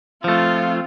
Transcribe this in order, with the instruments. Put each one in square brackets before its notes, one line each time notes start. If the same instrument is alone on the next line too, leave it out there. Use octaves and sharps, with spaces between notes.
[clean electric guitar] F3 A3 [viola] C4 F4